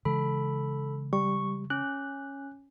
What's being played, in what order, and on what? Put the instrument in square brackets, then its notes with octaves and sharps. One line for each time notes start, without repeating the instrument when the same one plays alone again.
[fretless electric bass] C#3 E3 G#3 [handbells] A4 B5
[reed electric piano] G3 [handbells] C#6
[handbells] C#4 [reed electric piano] F#6